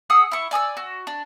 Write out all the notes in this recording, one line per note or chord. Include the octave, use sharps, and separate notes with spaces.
G#4 F#5 D#6 E6
E4 C#6
D5 G#5 D#6 E6
F#4
D4